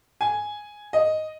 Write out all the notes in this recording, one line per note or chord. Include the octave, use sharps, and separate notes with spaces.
G#5
D#5